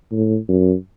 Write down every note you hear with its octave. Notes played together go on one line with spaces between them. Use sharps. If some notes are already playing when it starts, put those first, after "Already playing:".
A2
F#2